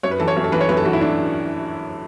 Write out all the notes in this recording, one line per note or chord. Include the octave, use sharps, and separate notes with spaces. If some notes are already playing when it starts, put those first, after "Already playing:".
F#2 C#5
B4
E3 A4
C#5
F#2
A4
E3 B4
C#5
F#2 B4
A4
E3 F#4
E4
D4